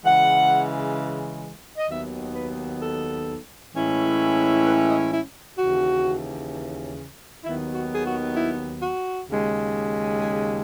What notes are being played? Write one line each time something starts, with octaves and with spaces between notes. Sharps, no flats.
C#3 E3 G#3 F#5
D#5
D#2 D#3 F#3 B3 D#4 E5
B4
A4
A2 E3 G#3 C#4 E4
B4
D#5
E4
D#2 C#3 E3 F#4
D#2 D#3 F#3 B3 E4
F#4
G#4
F#4
E4
F#4
D#2 C#3 G#3
G#4